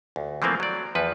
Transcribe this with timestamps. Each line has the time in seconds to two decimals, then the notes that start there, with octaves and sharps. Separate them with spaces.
0.16 D2
0.42 E3 F3 A3 A#3 C4
0.60 F#3 D5
0.95 E2 F3 B4